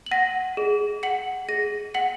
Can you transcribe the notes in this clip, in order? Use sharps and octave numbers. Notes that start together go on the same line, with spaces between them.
F#7
F#5 A#6 D#7
G#4
F#5 C#7 F#7
G#4 A#6 D#7
F#5 C#7 F#7